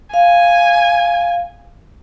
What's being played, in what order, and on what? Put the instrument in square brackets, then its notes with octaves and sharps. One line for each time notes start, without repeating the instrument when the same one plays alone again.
[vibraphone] F5 [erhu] G#5